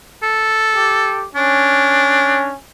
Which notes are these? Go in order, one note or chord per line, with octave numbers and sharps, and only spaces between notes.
A4
G4
C#4 D4